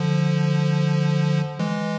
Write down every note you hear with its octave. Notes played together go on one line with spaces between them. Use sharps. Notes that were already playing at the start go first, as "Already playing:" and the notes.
Already playing: D3 F3
E3 G#3